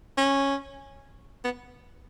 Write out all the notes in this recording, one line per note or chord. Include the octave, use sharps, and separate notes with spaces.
C#4
B3